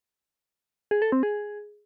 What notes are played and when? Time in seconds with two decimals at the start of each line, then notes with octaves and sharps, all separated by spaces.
0.91 G#4
1.02 A4
1.12 C4
1.23 G#4